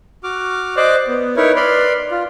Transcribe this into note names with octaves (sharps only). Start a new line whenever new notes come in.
F#4 D6 F6
C5 D5 D#5 D6 F#6
B3
D#4 E4 A#4 B4 C#5
B4 D5 B5 C6 F6
F4